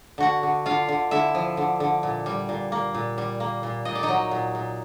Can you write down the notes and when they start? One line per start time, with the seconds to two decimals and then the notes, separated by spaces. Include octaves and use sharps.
0.18 D3 F#4 F#5
0.43 D3
0.66 D3 F4 F5
0.89 D3
1.11 D3 E4 E5
1.35 F3
1.57 D3
1.80 D3
2.03 A#2
2.26 G3
2.49 A#2
2.72 A#3
2.94 A#2
3.18 G3
3.40 A#3
3.63 A#2
3.85 A#2 D#5
3.95 D5
4.03 D#4 D#5
4.09 F#3
4.31 A#2
4.55 A#2